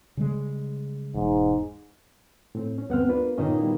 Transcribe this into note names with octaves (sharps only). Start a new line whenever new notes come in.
C#3 G3 G#3
E1 G#2
A2 C4
C#4
D2 B3 C4 F#5 F6
A#3 D4 F4 B4
A#2 D#3 C#4 F4 D#5
G3 B3 E4